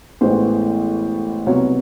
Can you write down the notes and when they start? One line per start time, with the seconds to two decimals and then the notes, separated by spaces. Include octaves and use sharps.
0.21 A1 A2 E3 G#3 B3 C5
1.46 C2 B2 F#3 B3 C#5